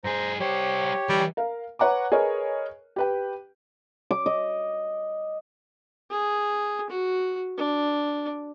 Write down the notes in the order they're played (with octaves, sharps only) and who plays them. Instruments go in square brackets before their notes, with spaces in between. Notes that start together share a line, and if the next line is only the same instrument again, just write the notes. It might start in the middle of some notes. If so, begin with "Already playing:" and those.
[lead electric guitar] G2 G#4 [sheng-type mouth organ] C5 A#5
[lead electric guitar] G3 C5 [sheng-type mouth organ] G4 C#5
[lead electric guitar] D#3 E3 [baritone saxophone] G3
[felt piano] A#4 F5
B4 C#5 F#5 A#5 D6
G#4 A#4 B4 C#5 D#5
G4 B4 G5
[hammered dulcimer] D6
D#5
[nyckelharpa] G#4
F#4
D4